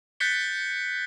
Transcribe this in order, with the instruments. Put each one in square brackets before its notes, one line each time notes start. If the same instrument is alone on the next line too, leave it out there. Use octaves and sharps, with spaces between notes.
[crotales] F#6 G6 A6 B6 C#7 G7